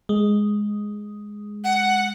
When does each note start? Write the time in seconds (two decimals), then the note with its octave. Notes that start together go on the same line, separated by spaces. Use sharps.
0.09 G#3
1.64 F#5